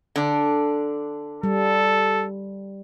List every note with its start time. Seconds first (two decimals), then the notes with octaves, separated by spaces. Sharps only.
0.16 D3 D4
1.43 G3 A4